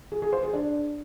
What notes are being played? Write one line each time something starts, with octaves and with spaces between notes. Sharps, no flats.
G#4
G#4
C5
G#4
D4